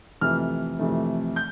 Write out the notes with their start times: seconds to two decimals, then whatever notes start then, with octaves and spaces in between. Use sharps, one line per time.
0.21 F2 C3 E3 A3 F6
0.79 F2 C3 E3 A3
1.36 G6